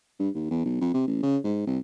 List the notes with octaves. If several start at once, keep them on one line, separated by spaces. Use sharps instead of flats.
G2
D#2
E2
B1
F2
C3
A1
C#3
G#2
C2